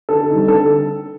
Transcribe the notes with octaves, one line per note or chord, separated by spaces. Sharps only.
D3 A4
G3 C4 D#4
D3 A4